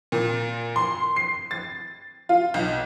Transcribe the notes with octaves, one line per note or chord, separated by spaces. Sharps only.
A#2
C6
C7
A6
F4
B1